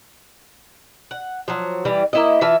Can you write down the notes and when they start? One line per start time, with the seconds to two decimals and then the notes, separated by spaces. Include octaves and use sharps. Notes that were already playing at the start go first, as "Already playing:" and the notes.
1.11 F#5
1.48 F3 F#3
1.85 E3 G3
2.13 A#3 E4 D#5
2.41 E3 F4 E5 A5